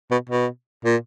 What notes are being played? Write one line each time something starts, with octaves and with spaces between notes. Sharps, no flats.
B2
B2
A#2